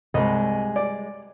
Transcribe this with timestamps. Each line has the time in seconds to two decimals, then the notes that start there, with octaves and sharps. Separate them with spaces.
0.14 C2 G3 G#3 D#5
0.76 D5